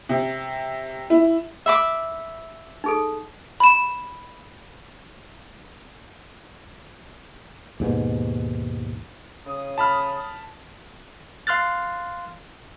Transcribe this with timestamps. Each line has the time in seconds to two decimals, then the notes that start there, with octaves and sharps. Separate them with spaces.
0.09 C3
1.10 E4
1.66 E5 B5 D6
2.84 D#4 G#4 A4
3.60 B5 E7
7.80 D#2 G#2 B2
9.46 C#3 D#6
9.78 A5 B5 F6
11.47 F5 C6 F6 F#6 A6